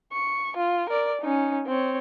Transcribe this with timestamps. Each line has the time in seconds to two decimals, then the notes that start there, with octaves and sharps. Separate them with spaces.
0.12 C#6
0.57 F4
0.89 A#4 D5
1.21 C#4 D#4
1.67 C4 C#5